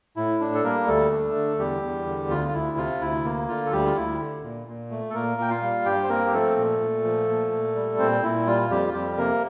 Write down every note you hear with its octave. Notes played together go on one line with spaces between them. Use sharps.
A2 E4
D4
A4
G3 A#3 A#4
D2 A3 A4
D4
D3
E2 G3 G4
E2
D3
D2 F4
F4
D2 E4
C3 F4
D2 E4
A#3
D3 F4
A4
D2 G3 G4
F4
D2 E4
D3
A#2
A#2
A3
A4
A#2 A#3 A#4
A#2 G5
F4 F5
G3
G2 G4 G5
C5
A#3 C4 A#4
G4
F3 A3 A4
A#2
A#2
F3
A#2
A#2
G3
A#2 C4 C5
A#2 E4
G3 F4
F2 G3 G4
F4
F2 G3 G4
C3 A#3 A#4